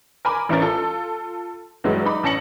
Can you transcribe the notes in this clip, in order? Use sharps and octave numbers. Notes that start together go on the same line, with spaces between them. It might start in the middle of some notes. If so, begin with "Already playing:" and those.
A#4 G#5 B5 D6
A1 E3 C#4 A#4 A6
F4 A4
G2 E3 F#3 G#3
D#4 B5 D6
A1 C#4 A5 A#6 C#7 F#7